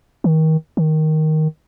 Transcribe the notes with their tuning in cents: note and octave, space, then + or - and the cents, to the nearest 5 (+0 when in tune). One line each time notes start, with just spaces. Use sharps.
D#3 +30
D#3 +5